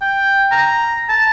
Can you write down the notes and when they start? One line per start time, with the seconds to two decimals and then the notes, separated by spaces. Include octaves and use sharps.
0.01 G5
0.52 A#5
1.09 A5